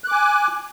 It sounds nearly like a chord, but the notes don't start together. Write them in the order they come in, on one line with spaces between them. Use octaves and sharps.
F#6 D6 G#5